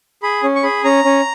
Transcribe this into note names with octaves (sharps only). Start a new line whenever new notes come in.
G#4 B5
C#4
C#6
G#4 B5
C#4 A#5
C#4